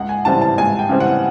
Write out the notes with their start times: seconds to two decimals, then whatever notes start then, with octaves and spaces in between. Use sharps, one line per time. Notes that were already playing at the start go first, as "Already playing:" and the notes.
Already playing: C#2 F#5
0.09 G#5
0.25 C#3 E3 G3 C4 A5
0.41 A5
0.58 C#2 G#5
0.79 G5
0.89 C#3 E3 G3 C4
1.00 F#5